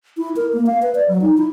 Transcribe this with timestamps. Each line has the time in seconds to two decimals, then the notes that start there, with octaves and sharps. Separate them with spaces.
0.17 E4
0.36 A#4
0.53 A#3
0.66 F5
0.82 B4
0.95 D5
1.09 F#3
1.22 D#4
1.37 E4